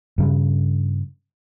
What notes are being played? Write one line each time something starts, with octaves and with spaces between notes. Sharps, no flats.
G2 C#3 G3